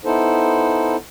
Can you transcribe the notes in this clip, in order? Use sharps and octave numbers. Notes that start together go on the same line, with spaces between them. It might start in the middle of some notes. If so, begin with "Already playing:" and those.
B3 D#4 E4 A4 C5